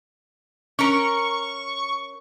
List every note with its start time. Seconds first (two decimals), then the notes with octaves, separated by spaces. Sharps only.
0.79 C#4 A#4 C#6